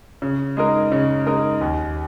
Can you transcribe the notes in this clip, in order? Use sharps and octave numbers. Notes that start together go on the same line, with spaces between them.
C#3
G#3 D#4 A#4
C#3
G#3 D#4 A#4
D#2